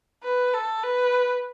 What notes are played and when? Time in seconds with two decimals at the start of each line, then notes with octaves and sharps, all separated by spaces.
0.24 B4
0.54 A4
0.84 B4